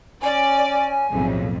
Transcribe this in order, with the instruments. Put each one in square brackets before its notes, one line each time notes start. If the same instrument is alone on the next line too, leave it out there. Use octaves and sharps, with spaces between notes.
[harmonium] C#4 [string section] D5 [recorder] G#5
[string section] B1 F2 A2 [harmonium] C#3